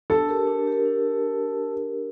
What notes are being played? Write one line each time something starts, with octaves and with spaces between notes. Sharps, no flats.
D4 A4
G4 A#4
D4
G4 A#4
D4